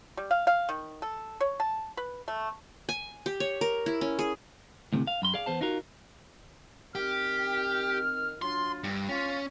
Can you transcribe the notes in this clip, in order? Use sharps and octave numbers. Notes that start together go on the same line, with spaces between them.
G3
F5
F5
D#3
A4
C#5
A5
B4
A3
G#5
G4
C#5
A#4
E4
C#4
G#4
D2 A2 C3
F5
F#2 B5 C6
G#4 D5 F5
E2 B3 C5 A5
D#4 F4 F#4 A#4
D#3 C4 G4 F6
F#3 D4 F4 C6
G2
C#4 F4